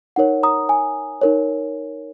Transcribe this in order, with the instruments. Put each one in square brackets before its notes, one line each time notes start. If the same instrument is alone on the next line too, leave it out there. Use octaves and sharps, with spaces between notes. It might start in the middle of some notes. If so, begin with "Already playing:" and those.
[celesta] D#4 A#4 C#5 F#5
A#5 D#6
G#5
D#4 A#4 C#5